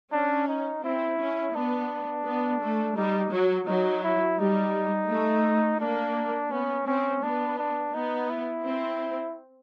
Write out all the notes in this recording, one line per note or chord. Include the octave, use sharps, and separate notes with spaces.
C#4 D4
D#4
C4 E4
C#4
B3 D4
B3
A3
G3 D#4
F#3
F#3 D#4
E4
G3 D#4
A3
A#3 D4
B3 C#4
C4 C#4
B3 D4
D4
B3 D#4
E4
C4